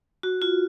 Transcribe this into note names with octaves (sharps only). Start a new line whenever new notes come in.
F#4
F4